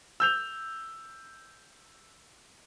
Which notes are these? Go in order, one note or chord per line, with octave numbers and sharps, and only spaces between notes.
E6 G6 F7